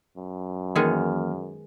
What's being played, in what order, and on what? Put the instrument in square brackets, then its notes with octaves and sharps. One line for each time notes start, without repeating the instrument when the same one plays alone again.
[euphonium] F#2
[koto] D#3 G#3 B3 [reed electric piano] E3 A#3 F6